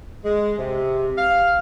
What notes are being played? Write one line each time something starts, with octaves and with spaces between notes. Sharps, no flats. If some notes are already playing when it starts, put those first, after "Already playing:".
G#3
C3
F5